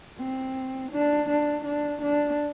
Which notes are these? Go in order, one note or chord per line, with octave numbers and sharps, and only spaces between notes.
C4
D4
D4
D4
D4